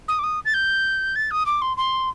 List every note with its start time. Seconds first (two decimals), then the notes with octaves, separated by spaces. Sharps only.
0.08 D#6
0.19 D6
0.23 D#6
0.45 A6
0.54 G6
1.15 A6
1.31 D#6
1.46 D6
1.62 C6
1.77 C6